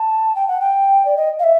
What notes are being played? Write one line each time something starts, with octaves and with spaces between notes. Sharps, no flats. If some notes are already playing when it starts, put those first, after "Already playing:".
Already playing: A5
G5
F#5
G5
D5
D#5
F5
E5